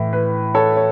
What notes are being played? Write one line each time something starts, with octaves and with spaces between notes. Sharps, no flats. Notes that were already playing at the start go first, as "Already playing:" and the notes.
Already playing: A2 E3
B4
A4 C#5
C#5